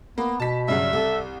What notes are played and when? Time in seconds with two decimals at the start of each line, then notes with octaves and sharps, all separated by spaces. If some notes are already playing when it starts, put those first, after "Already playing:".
0.18 A#3 B3
0.40 B2 A5 B6
0.68 G2 C#3 F#3 E5
0.93 C2 A4